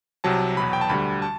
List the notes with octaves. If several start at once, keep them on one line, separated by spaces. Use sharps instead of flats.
C2 C3 F#3 A5
E2 B2 F#3 B5
G5
A5
D2 D3 G3 B5
A5